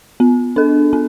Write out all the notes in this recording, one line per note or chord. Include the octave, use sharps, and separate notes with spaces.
B3
D4 A4
B3